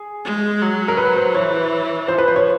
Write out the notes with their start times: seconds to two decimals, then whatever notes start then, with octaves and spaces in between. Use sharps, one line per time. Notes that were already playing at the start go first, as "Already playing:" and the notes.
Already playing: G#4
0.25 G#3
0.62 F#3
0.88 A#4
0.97 B4
1.16 C5
1.35 E3 C#5
2.08 F3 C5
2.18 B4
2.28 C5
2.36 C#5